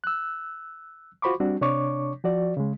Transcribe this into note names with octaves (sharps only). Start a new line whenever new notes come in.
E6 F#6
F4 F#4 C5 B5 C#6 D6
G3 C4 D4 F#4
C3 D4 C#5 C#6 D6
F3 F#4 D5
C#3 G#3